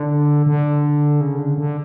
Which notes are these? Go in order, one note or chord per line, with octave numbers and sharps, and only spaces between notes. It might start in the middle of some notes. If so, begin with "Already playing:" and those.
Already playing: D3
D3
C#3
D3
D3